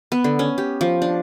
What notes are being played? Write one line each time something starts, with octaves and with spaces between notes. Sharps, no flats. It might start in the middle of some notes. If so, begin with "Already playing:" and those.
B3
D3
C#4
G4
F3
D4